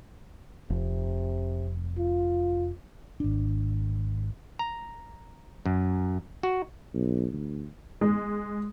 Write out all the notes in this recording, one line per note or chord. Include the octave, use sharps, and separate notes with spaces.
F1 C3
F4
G#1 D4
A#5
F#2
F#4
B1
D2
G#3